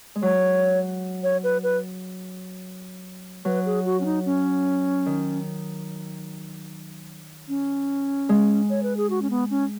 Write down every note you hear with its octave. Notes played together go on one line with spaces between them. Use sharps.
G#3
F#3 C#5
C#5
B4
B4
F#3 B4
G#4
F#4
C#4
D#4
C#4
D#3
C#4
G#3
C#5
B4
G#4
F#4
C#4
B3
C#4